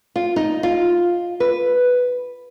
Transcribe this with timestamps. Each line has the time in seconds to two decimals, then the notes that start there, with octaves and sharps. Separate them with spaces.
0.16 F4
0.36 D#4
0.63 F4
1.40 B4